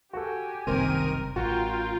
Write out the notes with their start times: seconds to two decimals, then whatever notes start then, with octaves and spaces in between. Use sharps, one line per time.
0.13 F#4 G4 A4 G#5
0.67 F#1 C2 D#3 C4 A#4 D#7
1.36 A1 F4 F#4 A#4 G5